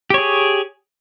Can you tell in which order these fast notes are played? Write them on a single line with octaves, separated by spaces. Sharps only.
G4 C#5 G#4